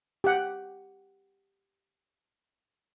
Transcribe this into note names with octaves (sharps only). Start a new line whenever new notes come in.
G4 F#5